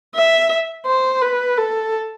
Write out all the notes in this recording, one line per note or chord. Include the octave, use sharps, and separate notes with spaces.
E5
C5
B4
A4